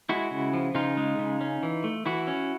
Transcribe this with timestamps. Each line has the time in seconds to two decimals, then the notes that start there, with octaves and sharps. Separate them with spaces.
0.09 G#3 E4 F#4
0.31 C#3
0.53 F3
0.74 C#3 D#4 F4
0.97 G#3
1.19 C#3
1.41 C#4
1.63 E3
1.84 A3
2.06 E3 E4 F#4
2.27 C#4